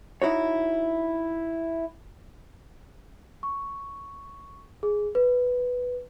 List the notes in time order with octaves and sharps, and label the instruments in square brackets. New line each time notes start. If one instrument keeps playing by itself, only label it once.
[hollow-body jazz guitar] D#4 E4 F#4 C#5
[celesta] C#6
G#4
B4